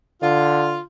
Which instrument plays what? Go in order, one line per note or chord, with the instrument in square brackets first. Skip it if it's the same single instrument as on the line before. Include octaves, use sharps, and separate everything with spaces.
[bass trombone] D3 [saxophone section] F4